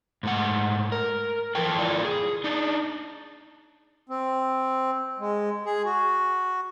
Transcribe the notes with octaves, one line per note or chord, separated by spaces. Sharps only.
G#2 A3 F#5
A#4
E3 F3 A4 G5
E4 F4 D5
G#4
D4 D#4
C4
G#3
G#4
F#4